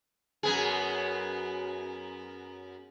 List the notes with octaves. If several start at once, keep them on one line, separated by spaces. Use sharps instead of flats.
F#2 B3 G#4